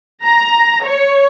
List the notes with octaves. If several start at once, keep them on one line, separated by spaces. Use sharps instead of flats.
A#5
C#5